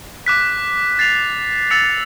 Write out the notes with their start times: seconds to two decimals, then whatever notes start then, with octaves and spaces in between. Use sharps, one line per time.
0.26 D6 F#6 B6
0.99 A6 C7 F7
1.70 E6 A6 C#7 F7